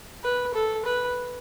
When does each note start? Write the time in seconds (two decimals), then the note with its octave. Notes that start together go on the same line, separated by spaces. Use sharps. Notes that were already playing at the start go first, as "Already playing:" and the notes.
0.24 B4
0.54 A4
0.85 B4